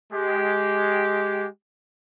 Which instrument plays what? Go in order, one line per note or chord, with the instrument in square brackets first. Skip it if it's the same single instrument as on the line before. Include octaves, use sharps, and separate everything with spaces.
[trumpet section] G#3 G4